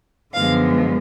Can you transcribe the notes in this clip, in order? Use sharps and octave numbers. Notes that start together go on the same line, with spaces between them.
F#2 D3 F3 G#3 B3 F5